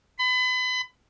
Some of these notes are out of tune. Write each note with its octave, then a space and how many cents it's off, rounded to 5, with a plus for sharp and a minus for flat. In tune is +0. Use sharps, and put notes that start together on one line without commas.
B5 +35